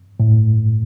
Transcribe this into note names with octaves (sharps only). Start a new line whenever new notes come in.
A2